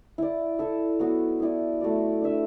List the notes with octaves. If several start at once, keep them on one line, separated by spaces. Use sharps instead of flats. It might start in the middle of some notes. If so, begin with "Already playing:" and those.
E4 D5
E4 A4 E5
F#3 B3 F#4
B3 E4 D5
F#3 A3 F#4 D5
D4 B4 E5